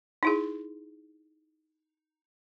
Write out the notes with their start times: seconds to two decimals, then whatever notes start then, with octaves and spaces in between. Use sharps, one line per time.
0.23 D#4 E4 G#4